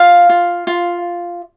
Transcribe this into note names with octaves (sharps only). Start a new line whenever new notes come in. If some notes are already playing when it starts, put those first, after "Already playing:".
Already playing: F4 F5
F4
F4